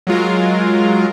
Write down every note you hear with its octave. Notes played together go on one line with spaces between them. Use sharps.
F#3 G#3 F4 A#4